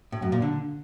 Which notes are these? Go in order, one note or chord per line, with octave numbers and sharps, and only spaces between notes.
A2
F#2
A#2
D3